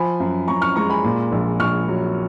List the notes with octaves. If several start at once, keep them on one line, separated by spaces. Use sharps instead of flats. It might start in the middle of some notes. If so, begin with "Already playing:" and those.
Already playing: F3 G#5 B5
F#2
F#2 A#5 C#6
C#6 F6
G#3 A#5 C#6
G#5 B5
A#2
A#1
A#1 C#6 F6
F#3